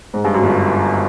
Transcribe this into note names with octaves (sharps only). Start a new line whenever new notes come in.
G#2
G2
F#2
G1 G2